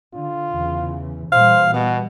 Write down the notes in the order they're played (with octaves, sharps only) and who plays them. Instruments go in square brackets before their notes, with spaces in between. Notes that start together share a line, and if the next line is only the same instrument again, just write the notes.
[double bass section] D3 [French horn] F4
[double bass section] E2 C#3 E3
[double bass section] A#2 E3 G3 [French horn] C5 [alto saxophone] F5
[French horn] B2 [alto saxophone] B3